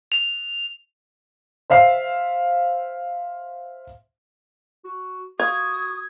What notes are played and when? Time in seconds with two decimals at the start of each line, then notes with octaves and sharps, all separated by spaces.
0.12 F7
1.70 C5 E5 F5 C7
4.85 F#4
5.40 F4 F#4 D#6 G#6